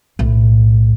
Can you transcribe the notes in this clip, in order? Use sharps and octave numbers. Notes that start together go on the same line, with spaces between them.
B1 A2